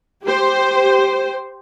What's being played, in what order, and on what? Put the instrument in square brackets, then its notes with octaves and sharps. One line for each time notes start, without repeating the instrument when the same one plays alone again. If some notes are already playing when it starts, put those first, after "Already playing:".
[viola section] G4 C5